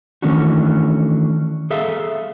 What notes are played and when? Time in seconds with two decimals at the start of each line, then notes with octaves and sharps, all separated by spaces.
0.22 D#3 E3 A3 C#4 D4 F#4
1.71 G#4 A4 E5 F5